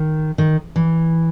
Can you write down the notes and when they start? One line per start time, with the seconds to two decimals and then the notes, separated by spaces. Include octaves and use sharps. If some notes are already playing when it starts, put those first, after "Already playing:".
Already playing: D#3
0.38 D#3
0.76 E3